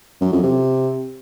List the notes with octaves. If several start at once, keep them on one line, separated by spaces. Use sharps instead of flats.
F#2
F2
C3